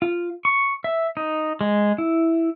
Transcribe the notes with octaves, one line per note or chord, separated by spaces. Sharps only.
F4
C#6
E5
D#4
G#3
E4